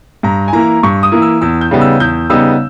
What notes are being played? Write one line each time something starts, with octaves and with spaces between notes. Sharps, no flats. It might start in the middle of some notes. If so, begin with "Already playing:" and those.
G2 A#5
G#5
E3 A#3 E4 A#5
G2 C#6
D#6
E3 A#3 E4
E6
E2 E6
G6
C#3 G3 B3 D#4
E6
E2 G6
C#3 G3 B3 D#4 E6